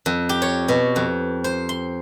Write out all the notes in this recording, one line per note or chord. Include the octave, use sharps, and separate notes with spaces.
F2
G4
C#5
B2
F2
C5
C6